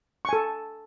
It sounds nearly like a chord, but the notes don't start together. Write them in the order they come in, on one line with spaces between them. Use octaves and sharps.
C#6 G#5 A4